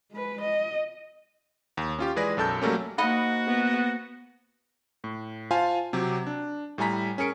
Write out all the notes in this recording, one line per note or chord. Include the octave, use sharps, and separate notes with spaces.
G#3 B4
D#5
D#2
C#4 F4 G4
E3 G#3 G#4 B4 D5 A#6
B1 F#2 A4 A5 G6
F#3 G3 A3 A#3 C#4
A#3 D#4 F#4 C5 D#5 F#5 B5
B3
A2
F4 C5 F5 G#5 A5
C3 F#3 G4
D4
A2 G3 E4 G#5 A#5 B6
C#4 G#4 A#4 C#7 D7